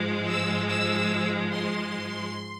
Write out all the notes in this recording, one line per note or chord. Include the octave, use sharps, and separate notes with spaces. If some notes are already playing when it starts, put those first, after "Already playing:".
Already playing: G#2 F3 G#3
E6
E6
C6